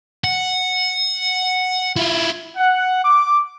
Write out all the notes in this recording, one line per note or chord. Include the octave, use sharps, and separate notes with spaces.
F#5
E4 F4
F#5
D6